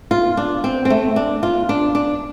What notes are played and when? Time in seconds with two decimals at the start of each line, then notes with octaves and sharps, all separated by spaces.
0.11 F4
0.37 D4
0.64 C4
0.85 C4
0.90 A3
1.16 D4
1.43 F4
1.69 D4
1.95 D4